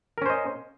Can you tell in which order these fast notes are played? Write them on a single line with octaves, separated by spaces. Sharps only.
A#4 C#4 C5 D#5